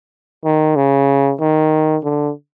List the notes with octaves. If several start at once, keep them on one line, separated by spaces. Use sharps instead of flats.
D#3
C#3
D#3
D3